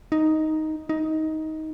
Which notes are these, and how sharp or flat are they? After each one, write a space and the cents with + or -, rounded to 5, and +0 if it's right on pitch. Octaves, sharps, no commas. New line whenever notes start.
D#4 +5
D#4 +15